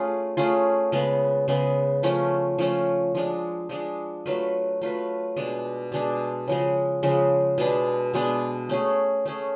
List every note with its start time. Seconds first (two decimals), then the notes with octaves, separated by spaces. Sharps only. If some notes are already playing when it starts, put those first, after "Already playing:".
Already playing: A3 C#4 F4 G#4
0.37 A3 C#4 F4 G#4
0.92 C#3 G#3 B3
1.48 C#3 G#3 B3
2.03 F3 A3 C#4 F4
2.59 F3 A3 C#4 F4
3.15 F3 G#3 D4
3.69 F3 G#3 D4
4.26 F#3 A3 F4 B4
4.82 F#3 A3 F4 B4
5.37 B2 G#3 D4
5.92 B2 G#3 D4
6.47 C#3 F3 G#3
7.03 C#3 F3 G#3
7.58 B2 G#3 B3 D4
8.14 B2 G#3 B3 D4
8.69 A3 C#4 G#4
9.25 A3 C#4 G#4